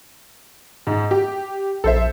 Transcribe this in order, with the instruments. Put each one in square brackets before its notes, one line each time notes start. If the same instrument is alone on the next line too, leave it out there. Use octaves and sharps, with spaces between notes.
[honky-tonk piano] G#2
G4
[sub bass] A#1 [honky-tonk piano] A4 C5 E5